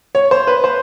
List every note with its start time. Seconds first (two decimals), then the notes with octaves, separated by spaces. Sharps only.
0.15 C#5
0.31 C5
0.47 B4
0.64 C5